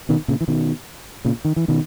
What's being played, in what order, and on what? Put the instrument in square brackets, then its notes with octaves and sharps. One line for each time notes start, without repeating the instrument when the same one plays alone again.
[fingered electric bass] B2 D#3
A#2 C#3
E3
B2 D#3
A#2 C#3
D#3
E3
B2 D#3